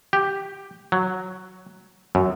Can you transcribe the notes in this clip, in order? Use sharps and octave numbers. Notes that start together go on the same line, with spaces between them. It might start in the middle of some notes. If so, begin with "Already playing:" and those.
G4
F#3
F#2